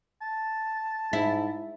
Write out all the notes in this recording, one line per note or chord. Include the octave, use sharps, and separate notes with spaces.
A5
G#2 E4